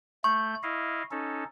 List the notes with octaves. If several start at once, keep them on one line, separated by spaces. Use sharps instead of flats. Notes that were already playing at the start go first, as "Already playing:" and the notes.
A3 C#6 G6
E4 D#5 F5
C#4 D#4 A4